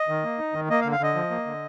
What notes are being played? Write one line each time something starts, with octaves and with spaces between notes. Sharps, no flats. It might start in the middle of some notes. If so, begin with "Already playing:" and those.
Already playing: D#5
D#3
A#3
D#4
D#3
A#3 D#5
F5
D3
F5
D3 D#5
F3
A#3
D3